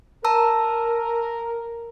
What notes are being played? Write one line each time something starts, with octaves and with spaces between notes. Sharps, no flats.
A#4 A5 A#5 E6